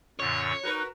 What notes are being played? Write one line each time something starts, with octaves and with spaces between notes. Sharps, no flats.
F#2 A#2 D3 C#5
D#4 F#4 A#4 B4